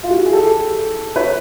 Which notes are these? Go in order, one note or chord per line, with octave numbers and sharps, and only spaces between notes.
F4
F#4
G4
G#4
G4 A4
B4 C#5